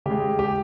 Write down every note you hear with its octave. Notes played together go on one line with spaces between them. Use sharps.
C#3 G#3 G4
G4